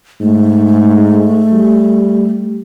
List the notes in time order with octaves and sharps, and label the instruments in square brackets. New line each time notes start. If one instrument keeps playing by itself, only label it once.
[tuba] G#2 [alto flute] A3
[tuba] G3